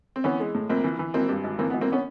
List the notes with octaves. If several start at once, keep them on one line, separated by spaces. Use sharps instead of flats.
C4
E3 B3 C#4
G#3
A2
A#1 A#3 C4
E3
E3
G#1 A#3 C4
G2
G#1
E3 A#3 C4
B3
G#1
A#3 C4
B3 C#4